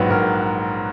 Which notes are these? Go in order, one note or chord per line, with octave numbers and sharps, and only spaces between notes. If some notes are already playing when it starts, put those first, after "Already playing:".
Already playing: A#1 G#2 F#3 B4
A#1 A#4